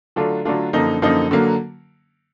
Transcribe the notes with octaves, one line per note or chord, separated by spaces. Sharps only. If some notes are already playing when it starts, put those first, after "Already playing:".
D3 F#3 A3 D4 F4
D3 F#3 A3 D4 F4
F#2 D3 F3 A#3 D#4
F#2 D3 F3 A#3 D#4
D3 F#3 A#3